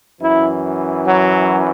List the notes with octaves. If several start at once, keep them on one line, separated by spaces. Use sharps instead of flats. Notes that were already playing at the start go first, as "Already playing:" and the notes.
F#2 E3 E4
F#3